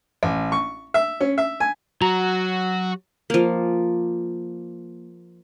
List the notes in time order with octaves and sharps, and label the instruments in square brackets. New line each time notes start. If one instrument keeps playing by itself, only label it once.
[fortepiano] A1
C#6
E5
C#4
E5
G#5
[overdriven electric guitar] F#3 [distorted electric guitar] F#4 [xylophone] A#5
[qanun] F3 A#3